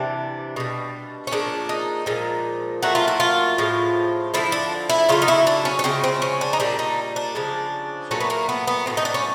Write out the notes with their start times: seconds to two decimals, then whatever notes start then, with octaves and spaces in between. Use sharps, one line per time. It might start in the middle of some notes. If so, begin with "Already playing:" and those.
Already playing: C3 E3 G3 D4
0.56 B2 G3
1.27 C#4
1.31 A#2 F3 G#3 D4
1.69 D#4
2.06 A#2 F3 G#3
2.83 A#2 F#3 A3 F#4
2.95 F4
3.08 E4
3.20 F4
3.58 A2 F3 G#3
4.34 D3 F3 G#3 E4
4.52 D4
4.90 E4
5.09 C#3 F#3 A3 F4
5.22 D#4
5.28 E4
5.47 D4
5.65 C#4
5.79 C#4
5.84 C#3 F3 G#3 C4
6.04 C4
6.22 C#4
6.41 D4
6.53 D#4
6.60 A#2 G3 D4
6.79 D#4
7.16 D4
7.35 C#3 F3 G#3
8.11 A#2 F#3 A3 C#4
8.21 B3
8.30 A#3
8.49 B3
8.67 B3
8.86 A2 F#3 A3 C4
8.97 D#4
9.05 D4
9.14 C#4